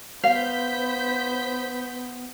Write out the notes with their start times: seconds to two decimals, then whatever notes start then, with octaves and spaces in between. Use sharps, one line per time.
0.24 B3 C5 F5 G6 B6